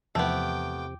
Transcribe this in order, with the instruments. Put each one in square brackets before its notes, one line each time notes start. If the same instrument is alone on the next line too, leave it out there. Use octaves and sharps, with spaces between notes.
[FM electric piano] E2 E3 F3 [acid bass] C3 [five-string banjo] A3 B3 [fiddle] G5 D6